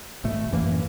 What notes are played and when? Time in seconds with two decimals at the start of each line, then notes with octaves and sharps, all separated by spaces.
0.24 G#1 B2 A3
0.51 A1 F#2 E3 A#3